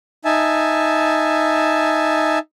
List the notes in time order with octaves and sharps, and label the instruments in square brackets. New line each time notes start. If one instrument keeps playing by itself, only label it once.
[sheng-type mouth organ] D#4 E5 G#5 A5